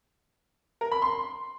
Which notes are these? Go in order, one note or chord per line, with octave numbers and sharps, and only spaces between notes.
A#4
B5
C6